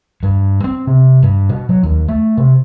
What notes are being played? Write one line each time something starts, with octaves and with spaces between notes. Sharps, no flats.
G2
C4
C3
G2
B2
F#3
D#2
A3
C3